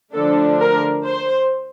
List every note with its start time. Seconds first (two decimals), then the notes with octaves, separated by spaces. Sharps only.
0.14 D3 F3 A3 D4 A4
0.60 A#4
1.06 C5